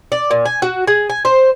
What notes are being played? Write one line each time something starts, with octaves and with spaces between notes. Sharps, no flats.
D5
A#2
G#5
F#4
G#4
G#5
C5